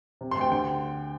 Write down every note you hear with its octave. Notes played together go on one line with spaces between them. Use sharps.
C3
C6
D2 G5
D3 G5